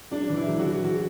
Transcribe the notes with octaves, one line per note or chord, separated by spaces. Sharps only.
F#2 D4
E3
E4
F#2
F#4
E3
F#4